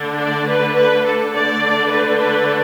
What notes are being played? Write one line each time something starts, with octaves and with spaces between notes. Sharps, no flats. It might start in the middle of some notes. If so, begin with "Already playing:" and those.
Already playing: D3 A3 D4
D5
B4
B4
A4
D3 A3 D4 D5
B4
B4